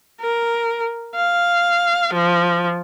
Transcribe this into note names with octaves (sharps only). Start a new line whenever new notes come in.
A#4
F5
F3